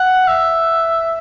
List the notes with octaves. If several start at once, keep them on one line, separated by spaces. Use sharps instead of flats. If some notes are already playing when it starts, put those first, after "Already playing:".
Already playing: F#5
E5